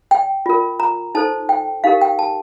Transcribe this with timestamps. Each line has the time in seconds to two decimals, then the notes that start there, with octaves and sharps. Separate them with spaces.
0.11 G5
0.46 F4 A#4
0.80 A#5
1.15 D#4 A4 C5 A5
1.49 G5
1.84 D#4 G4 A#4 F5
2.01 G5
2.19 A5